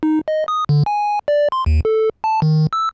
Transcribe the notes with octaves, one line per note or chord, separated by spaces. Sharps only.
D#4
D#5
D#6
D3
G#5
D5
C6
D#2
A4
A5
D#3
E6